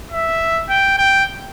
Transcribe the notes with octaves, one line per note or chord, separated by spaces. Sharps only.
E5
G5
G5